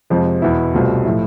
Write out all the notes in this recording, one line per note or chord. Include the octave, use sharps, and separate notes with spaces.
F2 C3 F3 G#3
E2 B2 B3 E4
C2 B2 A3 C4 F4
A2 F3 A3 E4